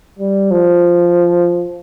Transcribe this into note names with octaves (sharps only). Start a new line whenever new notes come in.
G3
F3